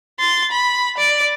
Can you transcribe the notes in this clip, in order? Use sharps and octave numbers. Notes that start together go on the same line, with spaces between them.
C6 A6
B5
D5